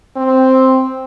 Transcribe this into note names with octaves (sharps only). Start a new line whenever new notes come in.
C4